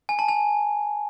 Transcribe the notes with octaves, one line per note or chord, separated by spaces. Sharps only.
G#5
A5
G#5